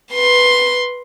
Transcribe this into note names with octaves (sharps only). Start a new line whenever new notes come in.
B4 C6